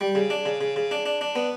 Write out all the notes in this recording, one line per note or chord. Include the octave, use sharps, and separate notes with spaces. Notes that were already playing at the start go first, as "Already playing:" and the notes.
G3
C#3
D4
C#3
C#3
C#3
D4
D4
D4
B3